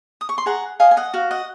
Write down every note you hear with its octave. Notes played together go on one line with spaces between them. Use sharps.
D#6
C#6
C6
G#4 F#5 A#5
D#5 F5 G#5
G#5
D#5 F#5
F#4 F5
D#5 F#5